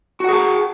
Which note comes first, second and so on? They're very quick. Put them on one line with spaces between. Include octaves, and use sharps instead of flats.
F#4 F#5 G#4 A5